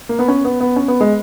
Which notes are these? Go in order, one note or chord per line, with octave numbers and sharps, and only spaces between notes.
A#3
B3
C#4
B3
B3
C#4
B3
G#3